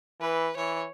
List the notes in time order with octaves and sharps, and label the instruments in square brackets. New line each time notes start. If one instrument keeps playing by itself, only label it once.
[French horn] E3 [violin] B4
[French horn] E3 [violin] C#5